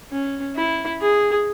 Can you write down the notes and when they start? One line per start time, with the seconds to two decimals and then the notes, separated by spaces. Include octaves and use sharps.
0.11 C#4
0.56 E4
1.01 G#4